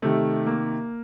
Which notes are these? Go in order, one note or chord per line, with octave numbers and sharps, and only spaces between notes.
C3 D#3 A3
A#3